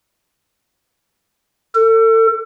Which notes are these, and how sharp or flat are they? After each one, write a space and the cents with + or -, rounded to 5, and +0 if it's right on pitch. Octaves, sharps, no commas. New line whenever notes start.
A4 +35